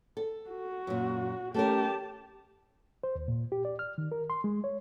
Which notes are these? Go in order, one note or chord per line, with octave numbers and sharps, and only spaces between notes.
A4
F#4
F#2 A#2
A3 C#4 G4 A#4 A5
C5
D#2
A#2
G4
D5
F6
D#3
A#4
C6
G#3
C#5